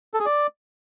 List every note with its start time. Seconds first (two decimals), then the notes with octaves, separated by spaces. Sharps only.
0.14 A4
0.20 G#4
0.26 D5